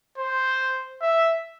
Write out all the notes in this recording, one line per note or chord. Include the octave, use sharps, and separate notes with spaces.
C5
E5